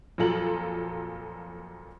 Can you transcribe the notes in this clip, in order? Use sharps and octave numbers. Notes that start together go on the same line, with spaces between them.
F2 A#2 F#3 F4 A4 F#7